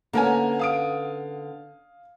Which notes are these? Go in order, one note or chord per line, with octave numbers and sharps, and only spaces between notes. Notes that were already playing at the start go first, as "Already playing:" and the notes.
D3 A#3 B3 C#4 A#4 G#5
F5 D#6 D7